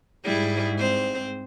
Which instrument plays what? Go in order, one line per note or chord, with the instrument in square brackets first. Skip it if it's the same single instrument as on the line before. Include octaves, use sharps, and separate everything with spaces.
[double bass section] G#2 [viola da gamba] G3 E4 G#4
[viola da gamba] C4 C5